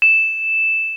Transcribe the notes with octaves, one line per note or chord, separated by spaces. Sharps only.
E7